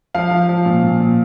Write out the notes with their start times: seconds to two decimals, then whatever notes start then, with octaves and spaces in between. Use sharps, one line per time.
0.14 F3 F5
0.31 F3
0.49 F3
0.65 A#2
0.83 A#2
1.00 A#2